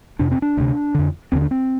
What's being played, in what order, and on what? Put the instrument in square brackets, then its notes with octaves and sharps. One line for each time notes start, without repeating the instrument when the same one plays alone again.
[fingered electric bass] F2 C3 D4
C4
D4
D2 C3
F2 D3
D#2 D3 C4
D4
C4